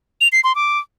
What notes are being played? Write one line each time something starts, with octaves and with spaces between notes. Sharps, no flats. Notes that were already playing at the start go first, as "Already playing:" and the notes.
F7
C7
C6
D6